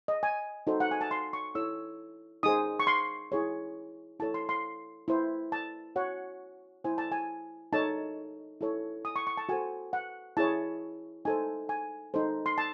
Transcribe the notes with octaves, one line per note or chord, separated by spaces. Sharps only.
D#5
G#5
D#4 F#4 A4 C5
F#5
G#5
A5
C6
C#6
E4 A4 C#5 E6
D#4 G#4 C5 D#6
C#6
C6
E4 G#4 C#5
E4 A4 C#5 A5
C6
C6
E4 C5
A5
F#4 C#5 F#5
E4 C5 G#5
A5
G#5
D#4 A4 C#5 A5
E4 A4 C#5
D#6
C#6
C#6
A5
F#4 A4 C5 G#5
F#5
E4 G#4 C#5 A5
D#4 A4 C5 G#5
G#5
D#4 A4 C5
C6
A5